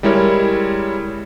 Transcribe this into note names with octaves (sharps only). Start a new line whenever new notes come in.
G3 G#3 E4 A#4 C#5